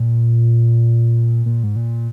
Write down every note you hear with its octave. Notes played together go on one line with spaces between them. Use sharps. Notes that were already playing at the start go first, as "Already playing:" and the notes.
Already playing: A#2
A#2
G#2
A#2